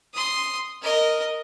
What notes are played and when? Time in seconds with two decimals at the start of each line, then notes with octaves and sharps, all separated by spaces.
0.14 C6 D#6
0.82 A#4 D#5